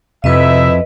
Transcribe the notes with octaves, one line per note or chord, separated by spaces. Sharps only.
F2 C3 D#4 E4 B4 D#5 E5